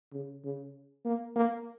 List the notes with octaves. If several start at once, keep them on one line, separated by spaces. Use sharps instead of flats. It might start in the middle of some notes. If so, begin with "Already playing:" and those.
C#3
C#3
A#3
A#3